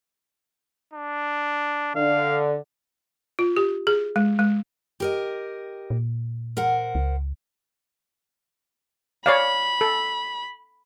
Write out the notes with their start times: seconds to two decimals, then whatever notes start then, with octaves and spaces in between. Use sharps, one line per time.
0.94 D4
1.95 D3 F5
3.39 F4
3.57 G4
3.87 G#4
4.16 G#3
4.39 G#3
5.00 G4 A#4 D#5
5.90 A#2
6.57 A#4 C5 F#5
6.95 C#2
9.26 C#5 D5 F5 B5
9.81 A4